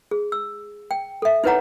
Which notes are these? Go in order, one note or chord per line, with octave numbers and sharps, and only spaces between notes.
G#4
E6
G5
A4 E5
D#4 E4 B4 C#5 F#5 A#5